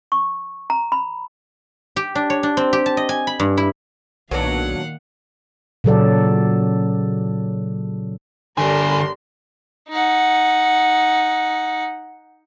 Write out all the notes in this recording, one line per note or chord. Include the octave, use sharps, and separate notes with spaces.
C#6
A#5
B5
G4
D4
C#5
D4
C4
G4
A5
D#5
G#5
B5
G2
E4
B1 A#2 D#3 F#3 B3 D4 F5 F#5
A#2 C#3 F#3 A4 D5
G1 D3 G4 A#4 D5 G#5 C6
D#4 F#5